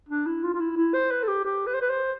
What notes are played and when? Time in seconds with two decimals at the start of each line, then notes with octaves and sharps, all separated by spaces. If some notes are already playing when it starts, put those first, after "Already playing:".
0.09 D4
0.26 E4
0.43 F4
0.54 F4
0.60 E4
0.77 E4
0.94 C5
1.11 B4
1.23 A4
1.28 G4
1.45 G4
1.67 B4
1.74 C5
1.81 B4
1.90 C5